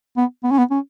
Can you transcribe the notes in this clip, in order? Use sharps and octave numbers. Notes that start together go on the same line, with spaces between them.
B3
B3
C#4
B3
C#4